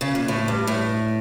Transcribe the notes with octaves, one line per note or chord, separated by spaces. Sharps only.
C#3
A#2
A2
G2
A2